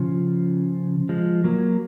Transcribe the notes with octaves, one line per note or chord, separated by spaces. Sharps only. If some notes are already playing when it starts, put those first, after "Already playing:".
Already playing: C#3 F3
F3 G#3
F#3 A#3